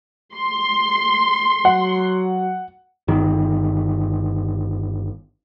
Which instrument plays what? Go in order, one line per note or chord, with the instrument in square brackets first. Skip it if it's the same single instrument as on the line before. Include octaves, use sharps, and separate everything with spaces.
[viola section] C6
[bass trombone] F#3 [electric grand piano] F#5
[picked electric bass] G1 D#3